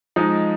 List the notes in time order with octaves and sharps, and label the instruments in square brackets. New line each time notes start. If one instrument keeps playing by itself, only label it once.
[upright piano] F3 G#3 [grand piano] D#4